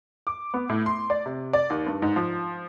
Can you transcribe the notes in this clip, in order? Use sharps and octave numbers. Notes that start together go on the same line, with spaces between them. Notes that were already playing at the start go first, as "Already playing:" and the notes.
D6
B3
A2
C6
D5
C3
D5
D#2
G2
G#2
F3